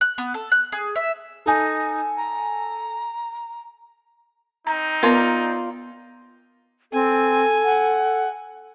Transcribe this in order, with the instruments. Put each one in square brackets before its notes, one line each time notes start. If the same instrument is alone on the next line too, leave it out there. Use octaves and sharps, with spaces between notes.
[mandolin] F#6
B3
A4
F#6
G#4
E5
[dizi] D#4 [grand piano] A4 G#5
[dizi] A#5
[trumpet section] C4 D#4 [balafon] A#5
[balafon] B3 B4 [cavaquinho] F4 A#4 D5
[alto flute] C4 [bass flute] A4 [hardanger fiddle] G#5
[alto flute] F#5